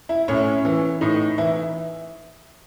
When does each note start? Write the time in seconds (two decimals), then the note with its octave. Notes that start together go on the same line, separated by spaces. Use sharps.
0.09 E4
0.28 A2 C#4
0.65 E3
1.01 A2 D#4
1.38 E3 E4